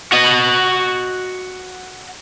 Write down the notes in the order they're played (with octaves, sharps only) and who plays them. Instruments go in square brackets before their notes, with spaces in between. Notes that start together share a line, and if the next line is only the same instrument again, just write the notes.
[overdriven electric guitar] F#4 D#5